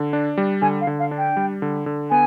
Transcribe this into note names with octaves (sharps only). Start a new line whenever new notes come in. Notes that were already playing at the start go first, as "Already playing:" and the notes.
Already playing: D3
D4
G3
D3 G#5
F5
D3
F5
D4
G5
G3
D3
D3
B3 G#5